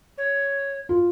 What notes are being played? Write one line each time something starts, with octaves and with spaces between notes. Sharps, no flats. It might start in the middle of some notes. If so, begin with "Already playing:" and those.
C#5
F4